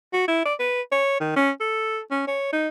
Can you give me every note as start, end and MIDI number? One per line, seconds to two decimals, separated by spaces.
0.13 0.28 66
0.28 0.42 64
0.45 0.54 74
0.59 0.81 71
0.92 1.17 73
1.20 1.33 51
1.36 1.51 61
1.60 1.99 69
2.11 2.23 61
2.27 2.52 73
2.53 2.69 63